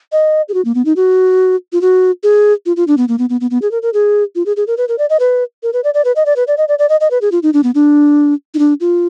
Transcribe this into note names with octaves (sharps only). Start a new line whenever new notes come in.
D#5
G#4
F#4
A#3
B3
D#4
F#4
F4
F#4
G#4
F4
F4
D4
B3
A#3
B3
B3
B3
B3
G#4
A#4
A#4
G#4
F4
G#4
G#4
A#4
B4
A#4
D5
D#5
B4
A#4
B4
D5
D5
B4
D#5
D5
B4
D5
D#5
D5
D5
D#5
D#5
B4
G#4
F4
D#4
D4
B3
D4
D#4
D4
F4